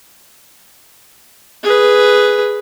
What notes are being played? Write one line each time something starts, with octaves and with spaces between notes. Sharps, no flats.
G#4 B4